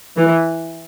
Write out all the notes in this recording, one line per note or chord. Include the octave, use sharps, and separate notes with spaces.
E3